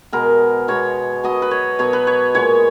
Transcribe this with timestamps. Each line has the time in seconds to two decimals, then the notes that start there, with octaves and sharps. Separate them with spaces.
0.12 B2 G#3 B3 A#4
0.68 B2 G#3 B3 C#5
1.24 B2 F#3 B3 D#5
1.42 B4
1.51 C#5
1.79 B2 F#3 B3 C#5
1.93 B4
2.07 C#5
2.34 A#2 G#3 B3 C#5